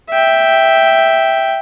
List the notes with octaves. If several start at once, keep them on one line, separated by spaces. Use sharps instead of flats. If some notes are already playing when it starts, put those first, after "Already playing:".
E5 G5